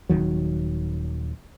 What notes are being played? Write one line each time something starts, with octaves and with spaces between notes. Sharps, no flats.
D#1 G#1 D#3 F#3